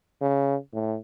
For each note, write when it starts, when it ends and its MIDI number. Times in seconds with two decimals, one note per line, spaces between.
0.21 0.55 49
0.73 0.96 45